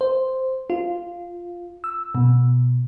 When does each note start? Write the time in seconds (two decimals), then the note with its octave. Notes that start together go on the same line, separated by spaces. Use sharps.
0.01 C5
0.70 F4
1.84 E6
2.15 B2